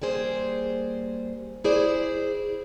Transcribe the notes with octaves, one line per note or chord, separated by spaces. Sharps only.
G3 A#3 G#4 C5
E4 G#4 C5 D5